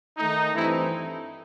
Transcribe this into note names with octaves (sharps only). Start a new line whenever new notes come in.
D#3 A3 D#4
G2 E3 A3 C4 D#4 E4